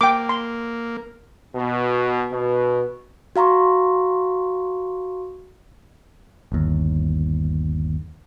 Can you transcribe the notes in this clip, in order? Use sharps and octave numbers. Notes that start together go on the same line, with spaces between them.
A#3 G5 D6
C6
B2
B2
F#4 F5 A#5 C6 C#6
G1 D#2